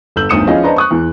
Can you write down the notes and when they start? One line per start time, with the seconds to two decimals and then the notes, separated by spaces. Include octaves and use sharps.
0.16 G1 A4 E6 G6 F#7
0.29 G1 D2 D#3 D#6 C#7 E7
0.47 F3 C#4 E4 G#4 D#5 F5
0.63 D4 B4 C5 D#5 A5 A#5
0.76 C#6 D#6 F#6
0.91 E2 E3